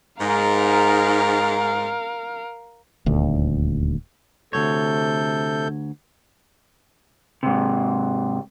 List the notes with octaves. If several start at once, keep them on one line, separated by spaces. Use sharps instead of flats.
G#2 A#4 F5
D#1 D2
D2 G#2 C3 A4 C#5 G6
G#2 C3